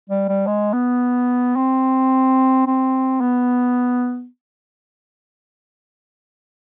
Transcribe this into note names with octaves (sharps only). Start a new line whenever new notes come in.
G3
G3
G#3
B3
C4
C4
B3